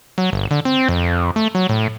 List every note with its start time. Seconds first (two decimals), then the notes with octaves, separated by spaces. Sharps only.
0.18 F#3
0.33 G1
0.51 D3
0.65 C4
0.88 F2
1.36 A3
1.55 F#3
1.69 A2